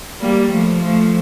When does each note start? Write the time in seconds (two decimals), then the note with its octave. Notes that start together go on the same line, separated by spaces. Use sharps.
0.20 G3 A#3
0.52 F3 A3
0.84 F3 A3